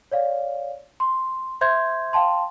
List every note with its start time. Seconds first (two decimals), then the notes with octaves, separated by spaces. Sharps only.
0.12 C#5 D5 F5
1.00 C6
1.61 C5 E5 C6 G6 G#6
2.13 F5 G5 A5 C6